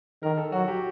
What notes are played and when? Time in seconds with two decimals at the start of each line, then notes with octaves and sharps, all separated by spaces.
0.23 D#3 A#4
0.37 A4
0.52 F#3 F#4
0.68 G4